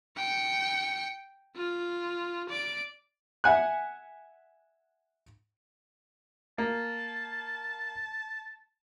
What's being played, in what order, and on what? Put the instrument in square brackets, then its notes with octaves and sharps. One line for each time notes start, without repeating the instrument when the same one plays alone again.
[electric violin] G5 C#7
F4
D5 D7
[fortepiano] E5 F#5 G#5 F#6
[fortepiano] A#3 [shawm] A5